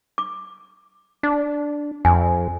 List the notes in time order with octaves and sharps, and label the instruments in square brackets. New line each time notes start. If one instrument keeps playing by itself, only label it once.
[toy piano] D6
[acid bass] D4
[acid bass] F2 [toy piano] G#5